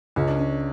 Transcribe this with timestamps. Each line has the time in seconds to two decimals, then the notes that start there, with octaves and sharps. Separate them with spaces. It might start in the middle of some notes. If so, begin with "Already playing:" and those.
0.16 C#2 C#4
0.28 D4
0.39 C#4